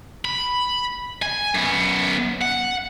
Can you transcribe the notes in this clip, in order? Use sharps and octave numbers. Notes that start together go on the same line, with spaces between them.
B5
G#5
F#2 B3
F#5